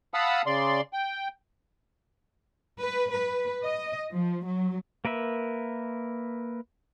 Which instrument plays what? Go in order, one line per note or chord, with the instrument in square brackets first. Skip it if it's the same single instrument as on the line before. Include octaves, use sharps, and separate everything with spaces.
[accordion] F5 F#5 A5 B5 D#6 E6
C#3 D5 C6
G5
[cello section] B4
B4
D#5
F3
F#3
[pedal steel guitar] A#3 A#4 B4 E5